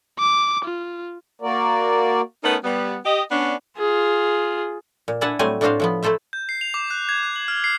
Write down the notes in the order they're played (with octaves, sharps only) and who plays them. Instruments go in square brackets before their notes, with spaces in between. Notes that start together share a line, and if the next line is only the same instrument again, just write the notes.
[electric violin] D6
F4
[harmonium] A#3 F#4 A#4 D5
[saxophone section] A3 B3 C#4 D#4 A#4
G3 B3
G4 D#5
B3 C#4 D4
[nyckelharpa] F4 G#4
[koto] A#2
D4 E4 E5 F#5 G#5 A5
A2 F#3 G3 A3 C4 G#5
A2 D4 F4 F#4 C5 F5
A2 F3 B3
A3 E4 A4 C5 E5
[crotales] G6
C7
F7
D6
F#6
G#6
F#6
F#7
F6
C7